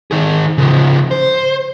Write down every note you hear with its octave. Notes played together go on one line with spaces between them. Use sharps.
D#3 G#4
C#3 F3
C5